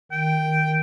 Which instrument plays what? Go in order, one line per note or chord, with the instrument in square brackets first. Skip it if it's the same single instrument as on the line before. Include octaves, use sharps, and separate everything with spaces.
[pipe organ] D#3 [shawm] G5